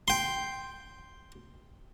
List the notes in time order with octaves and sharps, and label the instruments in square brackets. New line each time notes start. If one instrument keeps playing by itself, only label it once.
[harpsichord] G5 C6